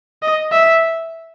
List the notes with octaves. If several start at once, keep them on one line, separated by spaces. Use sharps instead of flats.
D#5
E5